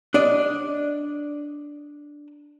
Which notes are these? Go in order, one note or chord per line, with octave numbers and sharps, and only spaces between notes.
D4 D5 D#5